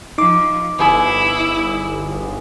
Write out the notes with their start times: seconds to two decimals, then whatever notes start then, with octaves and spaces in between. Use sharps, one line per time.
0.18 F3 D#4 D6
0.79 G1 B3 E4 G#4 B5